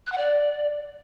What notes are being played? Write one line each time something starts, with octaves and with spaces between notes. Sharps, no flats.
F#6
F#5
D5